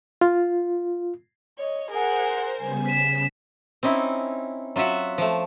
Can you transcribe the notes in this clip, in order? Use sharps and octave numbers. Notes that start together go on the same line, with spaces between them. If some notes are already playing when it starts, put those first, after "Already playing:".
F4
C#5 D#5
G#4 A#4 C5 F#5
C#3 G3 B3 G#5
C#3 B6 E7
C4 C#4 D#4 E4
F#3 F4 F#4 E5 F#5
F3 A3